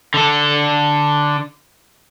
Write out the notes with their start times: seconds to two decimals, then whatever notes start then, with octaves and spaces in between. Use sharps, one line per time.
0.14 D3 A4